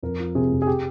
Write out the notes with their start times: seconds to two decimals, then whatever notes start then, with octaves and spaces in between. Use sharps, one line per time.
0.03 F2 A#4
0.19 F3
0.35 C3 G#4
0.51 F1
0.62 G#4
0.67 G4